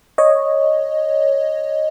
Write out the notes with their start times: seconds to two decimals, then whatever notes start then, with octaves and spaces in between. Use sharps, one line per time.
0.18 C#5 D#5